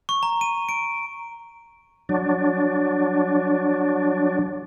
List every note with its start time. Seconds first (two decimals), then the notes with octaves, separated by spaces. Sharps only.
0.09 C#6
0.23 A#5
0.41 D#7
0.69 D7
2.09 F#3 D4